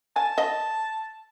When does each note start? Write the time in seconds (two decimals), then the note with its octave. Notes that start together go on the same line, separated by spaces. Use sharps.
0.16 G#5 A5
0.38 D#5